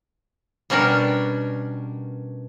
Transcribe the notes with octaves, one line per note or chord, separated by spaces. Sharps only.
B2 G3 C#4 D4 A#4